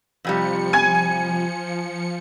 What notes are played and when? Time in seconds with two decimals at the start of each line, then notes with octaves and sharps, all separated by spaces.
0.25 F2 C3 F3 G3 C#7
0.73 G#5 G#6 D#7